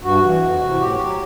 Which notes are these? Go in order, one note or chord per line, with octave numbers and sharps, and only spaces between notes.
G2 F#4
E3
F2
C3 E3
A2 G4
F#3